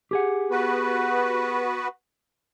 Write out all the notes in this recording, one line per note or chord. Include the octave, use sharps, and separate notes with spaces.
G4 G#4 F#5
B3 F#4 B4